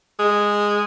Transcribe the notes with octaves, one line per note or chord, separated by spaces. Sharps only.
G#3